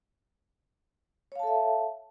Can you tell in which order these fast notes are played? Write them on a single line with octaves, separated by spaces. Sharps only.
C#5 F5 A5 A4 E5